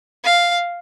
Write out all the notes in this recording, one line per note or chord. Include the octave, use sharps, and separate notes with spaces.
F5